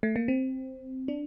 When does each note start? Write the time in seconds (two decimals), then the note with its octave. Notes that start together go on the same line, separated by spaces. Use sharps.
0.03 A3
0.16 A#3
0.28 C4
1.08 D4